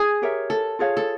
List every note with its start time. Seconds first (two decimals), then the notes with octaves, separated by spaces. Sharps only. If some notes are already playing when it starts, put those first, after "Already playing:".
Already playing: G#4
0.22 G4 A#4 C#5 E5
0.50 A4
0.79 F4 G#4 C#5 F5
0.97 A4